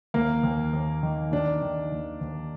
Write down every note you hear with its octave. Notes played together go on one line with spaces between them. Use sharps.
D#2 A#3
D#2
D#2
D#3
D#3 D4
D#3
D#2
D#2